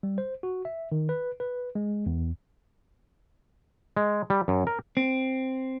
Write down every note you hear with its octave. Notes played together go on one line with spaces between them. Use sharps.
G3
C5
F#4
E5
D#3
B4
B4
G#3
E2
G#3
G3
F#2
A#4
C4